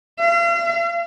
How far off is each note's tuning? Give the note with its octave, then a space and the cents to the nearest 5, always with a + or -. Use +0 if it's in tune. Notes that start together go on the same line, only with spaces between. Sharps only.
F5 -40